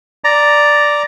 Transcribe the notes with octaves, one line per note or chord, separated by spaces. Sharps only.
D5 A#5